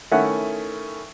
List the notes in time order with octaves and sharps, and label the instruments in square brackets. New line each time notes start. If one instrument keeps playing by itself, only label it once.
[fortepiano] D#3 A3 C#4 E4 F#5